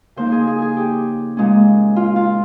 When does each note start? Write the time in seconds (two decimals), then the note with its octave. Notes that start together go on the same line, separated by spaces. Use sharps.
0.16 C#3 F3 A#3 D#4 C5
0.32 G#4
0.47 G#4
0.62 G#4
0.77 G4
1.37 A#2 G#3 C#4
1.96 F4
2.16 F4